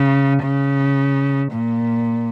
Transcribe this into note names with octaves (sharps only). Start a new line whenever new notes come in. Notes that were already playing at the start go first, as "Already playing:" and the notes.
Already playing: C#3
C#3
A#2